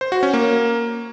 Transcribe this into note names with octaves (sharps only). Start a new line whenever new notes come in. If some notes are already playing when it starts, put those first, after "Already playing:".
C5
F#4
C#4
A#3